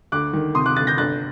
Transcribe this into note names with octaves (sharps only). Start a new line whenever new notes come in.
D2 D6 F#6
D#3
C3 C6 D#6
D6 F#6
D2 F#6 A6
G6 A#6
G1 F#6 A6